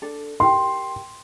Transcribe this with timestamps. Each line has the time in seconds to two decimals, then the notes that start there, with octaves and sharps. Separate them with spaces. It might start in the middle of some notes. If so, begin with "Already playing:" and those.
0.02 D4 A4
0.40 G4 A#4 C6